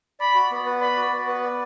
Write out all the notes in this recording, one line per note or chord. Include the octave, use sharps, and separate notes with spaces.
D5 B5
F#4
B3
B4
D5 B5
F#4
B3
B4
D5